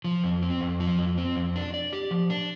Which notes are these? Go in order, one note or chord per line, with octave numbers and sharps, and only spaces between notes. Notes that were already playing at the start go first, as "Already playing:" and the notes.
F3
F2
C4
F2
F3
F2
C4
F2
D4
D5
G4
F3
D4